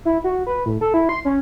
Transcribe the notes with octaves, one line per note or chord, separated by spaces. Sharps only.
E4
F#4
B4
A2
A4
E4
C6
C#4